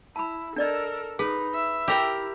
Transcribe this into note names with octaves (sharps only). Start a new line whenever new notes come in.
E4 A5 B5
D4 A4 A#4 D5 D#5
D#4 G#4 B4
E5
E4 G4 A#4 G5